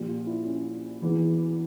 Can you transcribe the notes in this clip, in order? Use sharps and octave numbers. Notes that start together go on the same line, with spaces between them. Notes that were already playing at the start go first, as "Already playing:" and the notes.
Already playing: A#1 A#2 F3 G4
F4
E4
C#4
E1 E2 E3